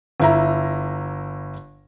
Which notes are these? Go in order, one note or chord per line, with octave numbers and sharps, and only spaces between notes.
G1 E4 A#5